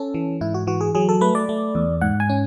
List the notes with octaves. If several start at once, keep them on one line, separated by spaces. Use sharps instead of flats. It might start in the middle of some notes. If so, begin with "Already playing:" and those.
Already playing: C#4 A4
E3
G#2 E4
F#4
E3 F#4
G#4
F#3 G#4
A4
A3 B4
D5
A3
E2
G#2 F#5
G#5
C#4